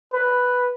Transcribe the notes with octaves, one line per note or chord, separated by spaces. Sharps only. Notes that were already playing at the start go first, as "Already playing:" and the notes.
B4